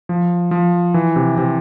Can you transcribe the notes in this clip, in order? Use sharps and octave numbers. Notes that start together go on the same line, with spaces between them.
F3
F3
E3
C3
C3